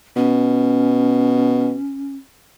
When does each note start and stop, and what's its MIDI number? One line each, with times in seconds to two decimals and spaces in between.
0.16 1.76 47
0.16 2.15 61